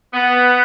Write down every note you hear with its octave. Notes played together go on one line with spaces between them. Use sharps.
B3